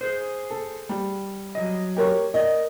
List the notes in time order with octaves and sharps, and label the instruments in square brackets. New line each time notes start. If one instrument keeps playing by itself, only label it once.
[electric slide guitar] G#4 C5
[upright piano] A4
G3
[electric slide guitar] F#3 D#5
[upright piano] G4 A#4 C#5
[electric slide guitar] A#4 D5 [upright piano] D#5